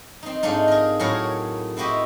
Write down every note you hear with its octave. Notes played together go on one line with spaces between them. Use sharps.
C4 D#4
G#2 A3 C4 D4 D#4 F4
G#4 A#4
A2 F#3 G#4 A#4 C#5 F#5
C4 E4 F#4 G4 D#5